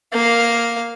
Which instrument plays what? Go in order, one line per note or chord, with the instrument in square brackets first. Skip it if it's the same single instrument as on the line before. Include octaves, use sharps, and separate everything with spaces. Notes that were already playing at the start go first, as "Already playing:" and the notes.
[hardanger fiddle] A#3 F5